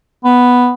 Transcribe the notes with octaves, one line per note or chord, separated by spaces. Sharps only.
B3